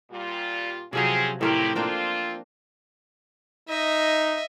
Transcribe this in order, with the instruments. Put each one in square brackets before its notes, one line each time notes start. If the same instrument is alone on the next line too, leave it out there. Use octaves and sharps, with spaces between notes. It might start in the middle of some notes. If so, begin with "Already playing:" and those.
[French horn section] A#2 G3 F4
[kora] C3 F3 F#3 [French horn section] C4 C#4 G#4
[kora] A2 C4 A#4 [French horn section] D#3 E4 G4
[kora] A#3 D4 G5 [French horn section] C4 F4
[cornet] D#4 [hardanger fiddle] D#5 E5